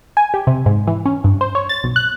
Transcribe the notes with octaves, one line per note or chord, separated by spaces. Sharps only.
G#5
G4
C3
G#2
E3
C#4
G2
C5
C#5
A6
B1
F#6